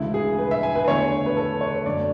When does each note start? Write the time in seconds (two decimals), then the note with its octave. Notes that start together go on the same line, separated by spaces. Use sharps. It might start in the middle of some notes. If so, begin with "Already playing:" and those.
Already playing: D2 C#3 E3 G#3 E4
0.14 G#4
0.38 B4
0.51 E5
0.63 G#5
0.75 B4
0.87 E2 D3 A3 C#5
1.26 B4
1.37 A4
1.61 C#5
1.85 F#2 D3 A3 D5